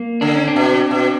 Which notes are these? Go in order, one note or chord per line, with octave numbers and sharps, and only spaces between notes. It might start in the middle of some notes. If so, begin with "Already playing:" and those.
Already playing: A#3
D3 D4
C#4
C4 D4
B2
B2